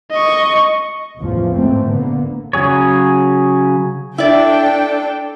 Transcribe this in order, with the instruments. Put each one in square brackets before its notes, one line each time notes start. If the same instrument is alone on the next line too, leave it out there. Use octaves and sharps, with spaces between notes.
[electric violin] D#5 C#6
[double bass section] A1 E2 F3
A1 G#2 E3 A3 A#3 C4
A#2 D3 A#3 B3
[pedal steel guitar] C#3 F#3 G#4 C#5
[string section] D4 A4 G5 [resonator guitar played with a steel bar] E4 D5